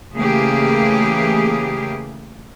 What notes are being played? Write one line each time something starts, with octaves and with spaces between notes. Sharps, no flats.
C#3 E3 A3 A#3 G4 G#4